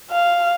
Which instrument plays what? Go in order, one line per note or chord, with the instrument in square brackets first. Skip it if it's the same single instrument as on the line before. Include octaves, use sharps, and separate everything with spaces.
[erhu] F5